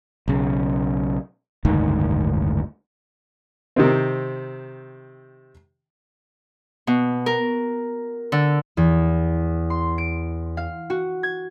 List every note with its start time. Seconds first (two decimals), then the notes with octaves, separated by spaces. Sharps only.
0.28 B1 C#3
1.65 F#1 D2 G#2 D#3
3.76 C3 D#3 C4
6.87 B2
7.26 A#4
8.32 D3
8.77 E2
9.70 C6
9.98 D7
10.57 F5
10.90 F#4
11.23 G#6